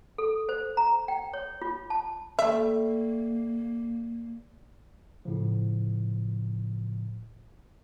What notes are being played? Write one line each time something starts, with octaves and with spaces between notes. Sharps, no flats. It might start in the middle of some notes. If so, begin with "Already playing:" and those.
A4
C5
A#5
G5
C#5
F4
A5
G3 A3 A#3 E5
A2 C#3 F3